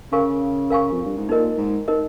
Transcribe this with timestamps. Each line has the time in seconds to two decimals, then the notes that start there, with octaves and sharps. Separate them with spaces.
0.12 C#3 A#4 F5 G#5 C#6
0.70 A#4 F5 G#5 C#6
0.92 F2
1.05 G2
1.17 G#2
1.29 A#2 D#4 A#4 D#5
1.58 G#2
1.88 D#4 A#4 D#5